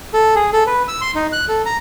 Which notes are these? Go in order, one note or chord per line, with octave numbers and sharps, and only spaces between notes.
A4
G#4
A4
B4
E6
C6
D#4
F#6
A4
A#5